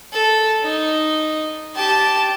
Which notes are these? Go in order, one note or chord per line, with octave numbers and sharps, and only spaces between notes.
A4
D#4
G4 A5